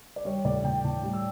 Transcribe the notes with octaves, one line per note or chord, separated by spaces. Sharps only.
D5
G3 C#5
A2 D5
A2 G5
A2 A5
G3
E6